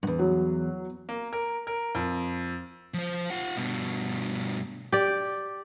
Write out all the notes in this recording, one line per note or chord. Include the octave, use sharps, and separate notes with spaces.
E2 G2
F#3
A#3
A#4
A#4
F2
F3 C5
F4 F#5
G2 B2
G4 D5